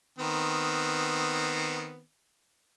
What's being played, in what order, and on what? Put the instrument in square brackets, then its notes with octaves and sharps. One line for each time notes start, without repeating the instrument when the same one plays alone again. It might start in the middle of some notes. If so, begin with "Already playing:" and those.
[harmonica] D#3 B3 C4